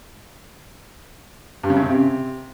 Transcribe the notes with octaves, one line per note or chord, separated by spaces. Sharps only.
G2
C#3
F#2
C#3
C3